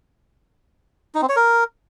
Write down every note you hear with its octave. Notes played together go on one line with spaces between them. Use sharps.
D#4
C4
C#5
A#4